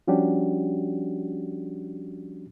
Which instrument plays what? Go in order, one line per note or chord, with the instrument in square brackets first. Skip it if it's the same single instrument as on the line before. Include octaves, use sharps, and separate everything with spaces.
[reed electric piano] F3 G3 C#4 D4 F#4 G4